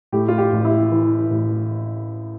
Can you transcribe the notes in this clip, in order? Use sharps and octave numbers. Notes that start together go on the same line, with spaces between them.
A2 G4
F4
G4
A1
E4
E3
A1